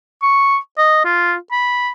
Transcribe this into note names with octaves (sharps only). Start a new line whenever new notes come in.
C#6
D#5
F4
B5